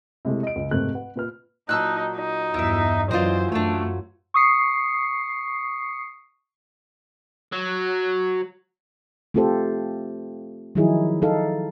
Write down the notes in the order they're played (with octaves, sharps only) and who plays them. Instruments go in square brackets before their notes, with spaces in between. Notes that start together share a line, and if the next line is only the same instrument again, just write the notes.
[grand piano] C3 G#3 A3 E4
D#5 D7
C#2
F1 G#2 A3 A#3 C4 F#6
B4 F#5
A#2 B4 F6
[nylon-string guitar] A#2 F#3 [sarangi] D#4 [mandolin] A5 E6 F#6
[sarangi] D#4
[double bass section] E2 G2 [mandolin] E4 E5
[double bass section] F#2 E3 [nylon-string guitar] F#3 F4 [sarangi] C5 [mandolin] D5 D#5
[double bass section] F#2 [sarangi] A3 [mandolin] D4 C#5
[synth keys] C#6 D#6 C7 C#7
[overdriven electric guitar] F#3
[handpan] A3 C4 F4 G4 A4 C5
D#3 F3 F#3 D#4 E4 G#4
D#4 A4 F5